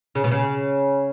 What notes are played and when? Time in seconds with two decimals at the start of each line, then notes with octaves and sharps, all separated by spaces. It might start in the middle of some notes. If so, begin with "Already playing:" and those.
0.15 C#3
0.24 B2
0.32 C#3